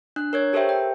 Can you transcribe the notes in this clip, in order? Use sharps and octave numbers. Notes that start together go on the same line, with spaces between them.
D4 F#6
A#4 C#5 G#6
G4 A4 A#4 C5 E5 G5
G5